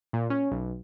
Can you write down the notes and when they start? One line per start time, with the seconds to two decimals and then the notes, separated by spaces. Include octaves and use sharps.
0.13 A#2
0.30 C#4
0.51 B1